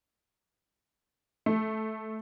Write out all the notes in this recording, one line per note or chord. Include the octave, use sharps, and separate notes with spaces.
A3